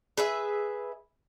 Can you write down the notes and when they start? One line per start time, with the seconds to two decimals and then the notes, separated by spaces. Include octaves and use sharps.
0.17 G#4 B4 E5